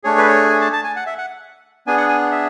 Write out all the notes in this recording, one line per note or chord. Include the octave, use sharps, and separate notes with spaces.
A3 D4 G#4 C#5
B4
C#5
G#5
A5
A5
G#5
F#5
E5
F#5
B3 D4 G#4 G#5
F#5
G#5
E5